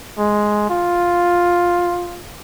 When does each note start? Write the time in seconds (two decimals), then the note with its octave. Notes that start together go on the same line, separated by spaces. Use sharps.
0.18 G#3
0.69 F4